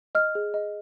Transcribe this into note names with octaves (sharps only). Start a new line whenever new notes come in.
D#5 F6
G#4
D#5